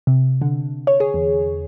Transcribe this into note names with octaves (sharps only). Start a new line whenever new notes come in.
C3
D3
C#5
G#4
E2